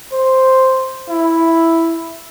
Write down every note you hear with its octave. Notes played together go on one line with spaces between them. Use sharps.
C5
E4